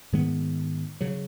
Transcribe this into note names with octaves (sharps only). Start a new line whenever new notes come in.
G#2 D#3 G#3 B3
C#3 F#3